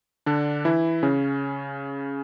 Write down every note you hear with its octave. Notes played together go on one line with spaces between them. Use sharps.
D3 D4
E3 E4
C#3 C#4